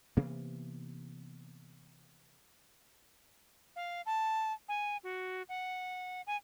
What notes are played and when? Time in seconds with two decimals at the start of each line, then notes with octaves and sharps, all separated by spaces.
0.17 C3 E3 A#3 B3
3.76 F5
4.06 A5
4.68 G#5
5.03 F#4
5.49 F#5
6.27 G#5